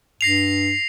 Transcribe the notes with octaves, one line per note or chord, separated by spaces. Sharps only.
G2 A#6 C7 F7